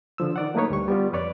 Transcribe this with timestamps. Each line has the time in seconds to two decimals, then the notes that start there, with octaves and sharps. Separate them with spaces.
0.18 D3 F3 E6
0.36 D#3 D5 F#5
0.54 F#3 A3 A#3 D#4 B4 C#5
0.70 D2 G3 C#6
0.88 G3 B3 F4
1.13 F2 B4 C#5 D5 D6